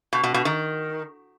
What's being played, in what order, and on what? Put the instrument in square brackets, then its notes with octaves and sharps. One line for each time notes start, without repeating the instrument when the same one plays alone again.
[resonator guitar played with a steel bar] B2
B2
B2
D#3